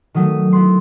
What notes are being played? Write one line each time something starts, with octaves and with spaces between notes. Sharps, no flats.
D#3 F#3 A3 D#6
F#3 B3 E4 C6